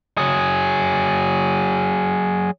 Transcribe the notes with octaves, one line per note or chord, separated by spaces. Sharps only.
F#3 G#4